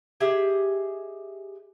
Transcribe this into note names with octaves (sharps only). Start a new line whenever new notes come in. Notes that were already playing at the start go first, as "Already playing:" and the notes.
G4 G#4 D#5 E5